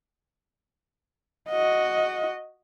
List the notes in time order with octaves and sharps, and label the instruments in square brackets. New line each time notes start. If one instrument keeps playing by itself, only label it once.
[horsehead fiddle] F#4 D#5